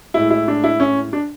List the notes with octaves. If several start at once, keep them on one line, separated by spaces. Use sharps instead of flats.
A2 G#3 E4
E4
D4
E4
C#4
D4